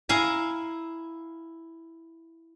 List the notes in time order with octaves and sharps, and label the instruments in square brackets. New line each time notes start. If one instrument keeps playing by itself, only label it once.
[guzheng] E4 F5 G#5 A#5